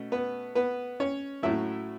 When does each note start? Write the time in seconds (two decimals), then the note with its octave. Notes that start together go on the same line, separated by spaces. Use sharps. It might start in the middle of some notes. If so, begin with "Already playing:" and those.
Already playing: B2 A3 C#4
0.12 B3 B4
0.55 B3 B4
1.00 C#4 C#5
1.43 A2 F#3 A3 C#4 E4 E5